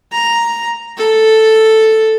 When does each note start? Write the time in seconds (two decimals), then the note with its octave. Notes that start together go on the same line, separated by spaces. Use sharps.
0.13 A#5
0.97 A4